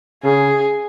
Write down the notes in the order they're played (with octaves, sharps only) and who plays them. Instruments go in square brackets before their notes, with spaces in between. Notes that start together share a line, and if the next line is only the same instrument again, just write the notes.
[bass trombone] C#3 [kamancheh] G#4